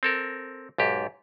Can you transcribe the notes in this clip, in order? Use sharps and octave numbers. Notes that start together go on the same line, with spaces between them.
C4 A4 A#4
B1 G#2 G4